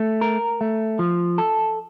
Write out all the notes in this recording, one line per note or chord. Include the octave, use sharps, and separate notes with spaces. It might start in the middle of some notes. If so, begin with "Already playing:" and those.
Already playing: A3
A#4
A3
F3
A4